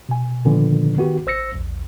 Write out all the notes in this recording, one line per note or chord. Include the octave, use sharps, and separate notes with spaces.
B2 G#5
A#2 D3 D#3 F3 B3 D4
D#3 B3 F#4 G4
A1 C5 E6 A#6 C#7
A#1 E2